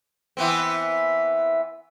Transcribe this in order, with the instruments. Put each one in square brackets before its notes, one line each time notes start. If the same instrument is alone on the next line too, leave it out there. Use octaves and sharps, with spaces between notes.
[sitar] E3 B3 C4